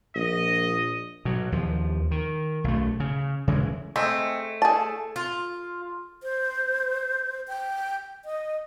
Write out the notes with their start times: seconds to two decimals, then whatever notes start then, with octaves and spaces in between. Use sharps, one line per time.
0.15 A#1 D#5
1.25 B2 F#3
1.52 D#2 F3
2.11 D#3
2.64 B1 A3
3.00 C#3
3.47 C#3 E3 G#3
3.96 G#3 A3 C4
4.62 G#4 A5
5.16 F4
6.23 C5
7.48 G5
8.25 D#5